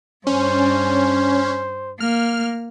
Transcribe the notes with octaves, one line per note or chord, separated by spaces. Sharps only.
G2 C#4 C5
A#3 F6